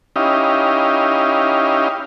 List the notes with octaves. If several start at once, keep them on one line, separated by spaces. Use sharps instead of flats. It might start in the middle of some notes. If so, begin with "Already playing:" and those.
C#4 D#4 E4 G4 D#5 F5